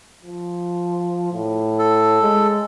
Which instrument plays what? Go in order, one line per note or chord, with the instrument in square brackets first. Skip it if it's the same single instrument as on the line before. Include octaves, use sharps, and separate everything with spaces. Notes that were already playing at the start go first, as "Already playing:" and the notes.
[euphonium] F3
A2
[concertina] A4
[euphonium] G#3